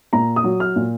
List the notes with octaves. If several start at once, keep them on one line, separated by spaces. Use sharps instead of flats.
A#2 A#5
D#6
F#3
F6
A#2